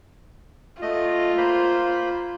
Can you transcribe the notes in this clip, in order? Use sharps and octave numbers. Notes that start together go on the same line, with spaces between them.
A3 F4 D#5
A#3 C5 B5